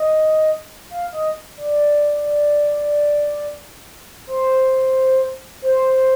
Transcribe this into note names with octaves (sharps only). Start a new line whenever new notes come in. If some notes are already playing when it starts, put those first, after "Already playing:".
Already playing: D#5
F5
D#5
D5
C5
C5